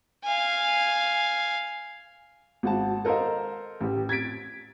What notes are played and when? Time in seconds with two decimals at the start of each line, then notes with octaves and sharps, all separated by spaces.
0.24 F5 G#5
2.63 G#1 F#4 A5
3.05 A4 A#4 C5 D#5 F5
3.81 A1 G4
4.09 G#6 A6 B6 D7